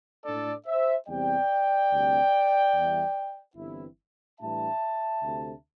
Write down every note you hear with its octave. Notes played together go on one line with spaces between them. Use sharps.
A2 A3 D4 A4 D5
C5 E5
E2 C3 G3 C4 D5 G5
D2 C3 G3 C4
E2 E3 G3 E4
G1 G2 E3 C4 E4
A2 E3 G3 D4 E5 A5
D2 C3 A3 D4